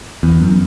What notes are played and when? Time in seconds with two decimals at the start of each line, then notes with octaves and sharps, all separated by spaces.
0.23 E2
0.41 F#2